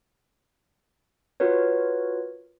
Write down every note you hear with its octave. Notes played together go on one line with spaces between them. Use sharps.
F4 F#4 A#4 B4 C#5